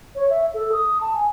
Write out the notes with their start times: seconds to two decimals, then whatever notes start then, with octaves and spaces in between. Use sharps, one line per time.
0.15 C#5
0.30 E5
0.54 A4
0.72 D#6
1.01 A5
1.15 G#5